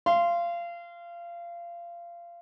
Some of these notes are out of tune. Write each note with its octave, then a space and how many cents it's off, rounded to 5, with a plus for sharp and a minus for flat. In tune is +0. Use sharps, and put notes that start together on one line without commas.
F5 -25 C6 +0